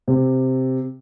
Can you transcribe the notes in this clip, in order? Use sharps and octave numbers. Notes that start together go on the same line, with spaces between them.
C3